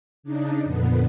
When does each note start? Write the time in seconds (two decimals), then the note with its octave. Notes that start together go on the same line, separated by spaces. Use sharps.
0.23 C#3 D4 D#4
0.63 F2 A#2 D3 B3